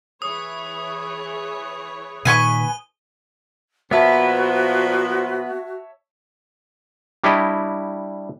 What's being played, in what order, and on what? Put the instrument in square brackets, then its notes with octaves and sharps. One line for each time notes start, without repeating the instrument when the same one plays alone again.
[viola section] E3 G#4 C#5 [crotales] D#6
[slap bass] A#2 D#3 [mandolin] B4 G#5 C#6 [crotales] D#7 G7
[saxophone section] A#2 F3 [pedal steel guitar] B3 B4 [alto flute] F#4 [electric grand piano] C#5 E5 A5
[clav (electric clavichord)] G3 D4 E4 G4 C#5 D#5